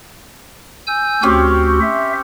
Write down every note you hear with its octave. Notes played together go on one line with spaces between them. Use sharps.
G#5 E6 G6
D2 C4 C#4 F#4 G4
E5